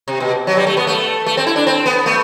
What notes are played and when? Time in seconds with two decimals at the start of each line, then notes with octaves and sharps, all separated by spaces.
0.08 C3
0.20 B2
0.47 F#3
0.57 G3
0.67 A3
0.77 B3
0.87 A3
1.26 A3
1.37 C4
1.47 E4
1.56 D4
1.67 C4
1.86 B3
2.06 A3